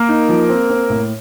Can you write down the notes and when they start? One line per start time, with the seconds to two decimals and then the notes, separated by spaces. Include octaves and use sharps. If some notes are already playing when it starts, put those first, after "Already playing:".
Already playing: A#3 A#4
0.09 D#4
0.29 F3
0.49 C4
0.70 C4
0.90 A2